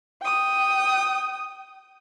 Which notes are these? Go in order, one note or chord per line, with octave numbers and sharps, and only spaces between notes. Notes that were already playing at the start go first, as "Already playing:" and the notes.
G5 D#6